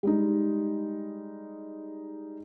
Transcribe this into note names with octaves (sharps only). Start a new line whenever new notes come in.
G3 G#3 D#4